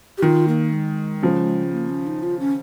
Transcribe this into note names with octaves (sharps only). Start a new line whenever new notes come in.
G4
D#3 F4
A#3
G#3
C#3 F3
A#3
C#4
D#4
F4
C#4